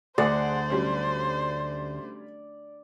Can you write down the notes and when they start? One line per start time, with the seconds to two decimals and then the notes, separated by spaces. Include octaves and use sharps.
0.18 D2 G#4 C5 D5 F#5
0.70 F#3 G3 C#4